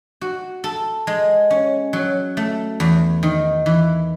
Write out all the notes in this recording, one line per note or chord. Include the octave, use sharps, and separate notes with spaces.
F#4
A4
G#3
C#4
F#3
A3
E2
D#3
E3